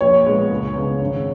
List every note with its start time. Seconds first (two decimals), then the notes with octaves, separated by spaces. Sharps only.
0.01 A#1 C#5
0.26 A#2 G#3 B3
0.51 C#2
0.75 C#3 G#3 B3
1.01 G#1